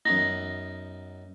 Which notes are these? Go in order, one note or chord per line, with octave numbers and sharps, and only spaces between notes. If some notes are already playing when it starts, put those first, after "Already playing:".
F#2 B3 D#4 A#6